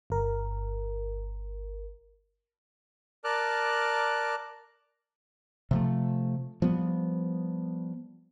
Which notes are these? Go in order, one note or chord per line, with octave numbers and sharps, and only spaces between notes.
G1 A#4
A#4 D5 A5 D6 F6 F#6
C3 F3 A3
F3 G3 B3